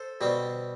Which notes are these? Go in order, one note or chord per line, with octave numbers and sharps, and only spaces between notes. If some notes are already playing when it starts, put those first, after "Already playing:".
Already playing: A4 C5
B2 G3 C4